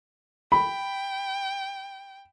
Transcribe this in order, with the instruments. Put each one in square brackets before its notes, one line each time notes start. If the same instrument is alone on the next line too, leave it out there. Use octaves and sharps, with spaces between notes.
[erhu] G5 [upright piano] B5